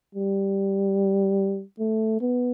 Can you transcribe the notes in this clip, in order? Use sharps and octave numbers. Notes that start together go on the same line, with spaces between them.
G3
A3
B3